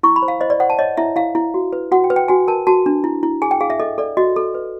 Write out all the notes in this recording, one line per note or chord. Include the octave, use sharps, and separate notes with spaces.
E4 C#6
B5
C5
F5
C5 D#5
D5
C5 F#5
A5
C#5 D#5
E4 E5
E4 F5
E4
F#4
B4
F#4 F#5
G5
B4
G5
F#4 G#5
A#4 A5
F#4 A5
D4
E4
E4
G#4 G#5
G5
G#4 F5
E5
A4 D#5
A4 D5
F#4 D#5
A4
B4